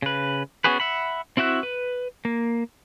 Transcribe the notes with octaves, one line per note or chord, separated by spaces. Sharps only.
C#3 B4
B3 C#4 F#4 G#4 B4
E5 F#5 B5
C4 E4 F#4 E5 F#6
B4
A#3